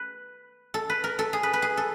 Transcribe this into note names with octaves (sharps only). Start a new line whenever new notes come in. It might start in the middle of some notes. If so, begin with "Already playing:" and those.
Already playing: B4
A4
B4
A#4
A4
G#4
B4
B4
G#4
A4